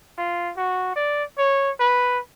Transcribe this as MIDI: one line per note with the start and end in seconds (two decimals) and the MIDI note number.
0.18 0.51 65
0.56 0.94 66
0.96 1.23 74
1.38 1.70 73
1.80 2.19 71